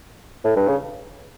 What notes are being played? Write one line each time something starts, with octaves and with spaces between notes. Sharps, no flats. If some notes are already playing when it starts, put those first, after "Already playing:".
A2
G2
C#3